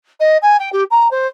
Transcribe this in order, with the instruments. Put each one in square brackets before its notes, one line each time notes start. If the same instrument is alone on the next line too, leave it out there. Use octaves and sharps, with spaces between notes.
[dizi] D#5
G#5
G5
G4
A#5
C5